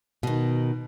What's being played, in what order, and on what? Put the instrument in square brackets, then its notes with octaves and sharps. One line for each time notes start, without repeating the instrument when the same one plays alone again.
[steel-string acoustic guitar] B2 D#3